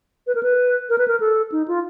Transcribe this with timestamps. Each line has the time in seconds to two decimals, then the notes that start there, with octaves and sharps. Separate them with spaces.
0.27 B4
0.35 A#4
0.43 B4
0.89 A#4
0.98 B4
1.08 A#4
1.20 A4
1.52 D#4
1.68 F4